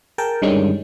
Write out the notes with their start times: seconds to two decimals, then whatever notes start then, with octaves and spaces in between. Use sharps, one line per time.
0.18 G#4 A#4 G5 A5
0.42 G2 D3 D#3 G3 G#3 C#4